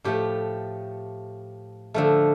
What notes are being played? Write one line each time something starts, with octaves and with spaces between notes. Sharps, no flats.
A2 F3 A3 G4
D3 F3 A3